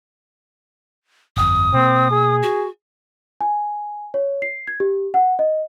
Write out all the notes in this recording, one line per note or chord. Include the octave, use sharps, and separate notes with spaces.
G1 F2 D#6
B2 A#3 C4
G#4
F#4
G#5
C#5
C7
G#6
G4
F#5
D#5